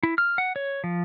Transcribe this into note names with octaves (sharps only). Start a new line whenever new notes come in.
E4
F6
F#5
C#5
F3